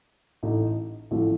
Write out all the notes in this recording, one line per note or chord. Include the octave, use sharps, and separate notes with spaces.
A1 A2 A3 D#4
A1 A2 F3 A3 C#4